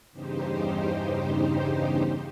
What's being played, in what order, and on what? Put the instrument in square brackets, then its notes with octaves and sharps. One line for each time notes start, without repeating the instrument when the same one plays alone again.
[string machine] E2 G2 C#3 D#4 G4 C5